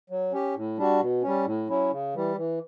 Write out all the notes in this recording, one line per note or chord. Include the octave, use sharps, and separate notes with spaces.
F#3
C#4 G4
A2
G3 D4 F#4
B2
G3 C#4
A2
F#3 C#4 E4
C#3
E3 G3
E3